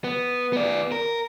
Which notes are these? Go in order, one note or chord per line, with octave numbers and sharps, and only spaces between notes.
B3
B3 D5
A#4